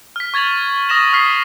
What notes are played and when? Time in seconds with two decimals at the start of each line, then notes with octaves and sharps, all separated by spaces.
0.16 F6 B6
0.34 C#6 G#6 A6 F7 F#7
0.89 C#6 D#6 A#6 E7 F#7
1.12 C#6 D#6 F6 B6 C7